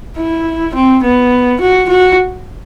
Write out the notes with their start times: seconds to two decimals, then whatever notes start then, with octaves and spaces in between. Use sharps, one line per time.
0.17 E4
0.75 C4
1.03 B3
1.61 F#4
1.89 F#4